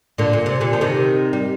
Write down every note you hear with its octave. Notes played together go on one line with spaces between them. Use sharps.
A#2 D3
A#2
C3
A#2 D3
F3
C3 D#3
G3